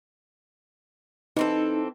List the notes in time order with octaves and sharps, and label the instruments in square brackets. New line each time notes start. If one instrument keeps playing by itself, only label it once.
[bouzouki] E3 C4 A4 [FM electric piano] D#4